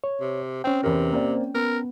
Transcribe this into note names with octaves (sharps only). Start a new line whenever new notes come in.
C#5
C3
C4 C#4 G5
E2 C3 A#4
A#3 C4 D5
B3 A#4